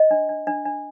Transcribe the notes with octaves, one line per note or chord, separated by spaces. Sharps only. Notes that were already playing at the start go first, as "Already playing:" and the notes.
Already playing: D#5
D4
D4
D4
D4